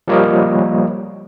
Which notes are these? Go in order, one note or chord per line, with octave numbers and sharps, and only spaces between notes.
F3 G3 A#3 A#4 C#5 D#5